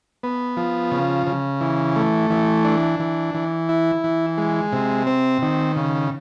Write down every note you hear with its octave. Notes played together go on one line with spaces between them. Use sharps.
B3
F3
C#3
C#3
E3
A3
E3
D4
E3
E3
E4
E3
G#3
C3
C4
D#3
C#3